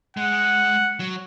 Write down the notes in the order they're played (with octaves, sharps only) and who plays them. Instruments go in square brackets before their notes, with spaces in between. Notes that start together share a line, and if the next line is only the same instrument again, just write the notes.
[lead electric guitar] G#3 [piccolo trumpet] F#5
[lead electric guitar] F#3